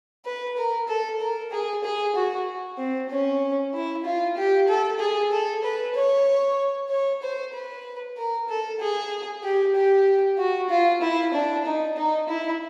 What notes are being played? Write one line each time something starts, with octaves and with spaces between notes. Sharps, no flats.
B4
A#4
A4
A#4
G#4
G#4
F#4
C4
C#4
E4
F4
G4
A4
G#4
A4
B4
C#5
C#5
C5
B4
A#4
A4
G#4
G4
G4
F#4
F4
E4
D4
D#4
D#4
E4